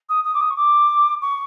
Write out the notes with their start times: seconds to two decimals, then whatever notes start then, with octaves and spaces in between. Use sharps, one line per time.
0.09 D#6
0.24 D#6
0.34 D6
0.41 D#6
0.50 C#6
0.56 D6
1.21 C#6